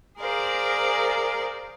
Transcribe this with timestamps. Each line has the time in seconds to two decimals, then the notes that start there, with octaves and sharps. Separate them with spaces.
0.19 G#4 A#4 C5 D5 F5